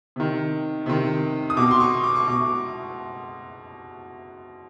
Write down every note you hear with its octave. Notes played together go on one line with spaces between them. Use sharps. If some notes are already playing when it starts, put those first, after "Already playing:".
C3 D#3
C3 D#3
D#6
B2 D6
C6
C#6
D6
C#6
B2 D6